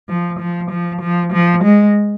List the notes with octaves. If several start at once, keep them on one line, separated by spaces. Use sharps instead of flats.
F3
F3
F3
F3
F3
G#3